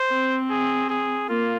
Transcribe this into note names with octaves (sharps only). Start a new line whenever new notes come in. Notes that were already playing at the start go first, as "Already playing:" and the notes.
Already playing: C5
C4
G#4
G#4
A#3 F4